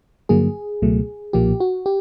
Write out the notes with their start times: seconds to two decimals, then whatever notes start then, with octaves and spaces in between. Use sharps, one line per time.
0.29 G2 D3 F#3 A#3 G#4
0.82 C#2 B2 F#3 A3
1.33 B1 A#2 F3 A#3 G4
1.60 F#4
1.86 G4